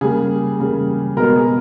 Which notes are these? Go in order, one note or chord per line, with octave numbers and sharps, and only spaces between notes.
C#3 G3 A#3 G#4
C#3 G3 A#3
B2 G#3 B3 A#4
G#4